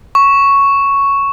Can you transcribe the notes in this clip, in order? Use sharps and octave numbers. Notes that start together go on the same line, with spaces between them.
C#6